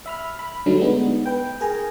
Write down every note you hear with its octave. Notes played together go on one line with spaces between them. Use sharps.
E5 B5 F6
B5
D3 F#3 G3 A3 D4 D#4
G#3 B3 D#4
B4 G5
G#4 A#4 G#5 A#5